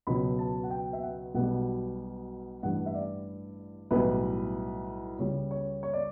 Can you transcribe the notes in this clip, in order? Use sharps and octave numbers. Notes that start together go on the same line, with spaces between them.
C#2 B2 F#3 B5
A5
F#5
G5
E5
F#5
B1 B2 G3 F#5
A1 G2 E3 G3 F#5
E5
D5
B1 A2 E3 G3 B4
C#2 C#3 G3 C#5
C#5
C#5
D5